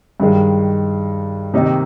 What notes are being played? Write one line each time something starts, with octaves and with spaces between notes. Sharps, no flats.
G2 D#3 G#3
C3 D#3 A#3 D#4